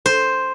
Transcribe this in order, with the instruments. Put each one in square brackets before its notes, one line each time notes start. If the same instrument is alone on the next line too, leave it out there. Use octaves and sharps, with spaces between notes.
[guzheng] C5